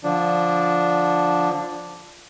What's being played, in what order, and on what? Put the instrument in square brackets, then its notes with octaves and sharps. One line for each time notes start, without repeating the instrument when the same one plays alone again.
[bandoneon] D3 F3 D4